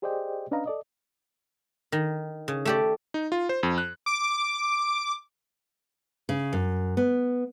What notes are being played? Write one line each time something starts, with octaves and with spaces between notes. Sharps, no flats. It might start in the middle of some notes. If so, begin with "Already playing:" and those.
G4 G#4 C5 D5 D#5 G5
C#4 D4 B4 D#5 F5 A#5
A4 D5 D#5
D#3
C#3
A3 G4 D5
D#4
F4
C5
F2
F#6
D6
C#3
F#2
B3